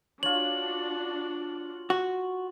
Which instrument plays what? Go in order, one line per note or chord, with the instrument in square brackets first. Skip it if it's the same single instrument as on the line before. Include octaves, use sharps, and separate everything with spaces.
[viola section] D4 F#4 [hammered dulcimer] F4 C#5 [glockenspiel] F#7
[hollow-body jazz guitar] F#4